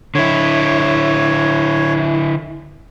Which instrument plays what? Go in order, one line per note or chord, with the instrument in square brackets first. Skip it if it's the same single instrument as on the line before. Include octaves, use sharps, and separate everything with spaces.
[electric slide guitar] D3 E4 [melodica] C#5